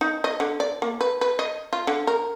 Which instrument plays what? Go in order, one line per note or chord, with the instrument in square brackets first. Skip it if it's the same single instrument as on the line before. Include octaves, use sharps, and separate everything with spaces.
[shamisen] D#4
D#5
D3
D5
A#3
B4
B4
D#5
F4
D3
A#4